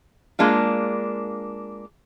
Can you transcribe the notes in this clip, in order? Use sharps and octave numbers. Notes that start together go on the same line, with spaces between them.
G#3 A#3 D4 F4